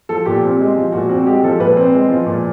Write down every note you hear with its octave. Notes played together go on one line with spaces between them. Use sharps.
F3 A4
A#2 G4
C4
G#3
F3
A#2 F#4
C4 F#4
G#3 G4
F3 A4
A#2 B4
C4
G#3
F3
A#2